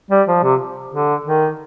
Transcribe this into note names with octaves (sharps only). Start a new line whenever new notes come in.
G3
F3
C3
D3
D#3